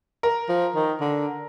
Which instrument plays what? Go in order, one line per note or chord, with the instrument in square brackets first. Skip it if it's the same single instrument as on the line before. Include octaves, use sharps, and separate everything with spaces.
[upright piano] A#4
[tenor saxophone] F3
D#3
D3